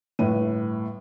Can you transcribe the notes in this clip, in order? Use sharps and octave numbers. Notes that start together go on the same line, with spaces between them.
G1 A2 B4 D#7